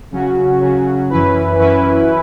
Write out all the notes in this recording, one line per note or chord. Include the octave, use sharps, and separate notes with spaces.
C#3 F#3 C#4 F#4
C#3 F#3 C#4 F#4
F#2 E3 C#4 E4 B4
F#2 E3 C#4 E4 B4